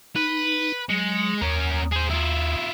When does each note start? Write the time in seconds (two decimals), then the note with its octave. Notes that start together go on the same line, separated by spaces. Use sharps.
0.16 D#4 B4
0.89 F#3 G#3
1.42 D#2 C#4 A#4
1.92 G#4 C5
2.10 E4 F4